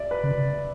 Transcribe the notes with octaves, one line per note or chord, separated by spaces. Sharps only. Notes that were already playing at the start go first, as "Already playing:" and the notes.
Already playing: D5 E5
B4
C#3